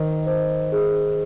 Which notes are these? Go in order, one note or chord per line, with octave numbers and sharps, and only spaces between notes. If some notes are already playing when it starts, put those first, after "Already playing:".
Already playing: D#3 C5
C5
G#4